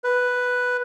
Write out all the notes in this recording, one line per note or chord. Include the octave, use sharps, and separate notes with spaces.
B4